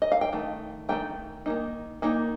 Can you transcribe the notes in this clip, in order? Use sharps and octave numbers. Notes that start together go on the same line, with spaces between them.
D#5
F5
G5
D#3 A3
D#3 A3 D#4 G5
D#3 A#3 D#4
D#3 A#3 D#4